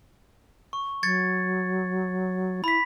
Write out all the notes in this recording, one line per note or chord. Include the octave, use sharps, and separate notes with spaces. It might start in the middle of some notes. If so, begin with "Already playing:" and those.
C#6
F#3 G#6 A6 C#7
E4 B5 B6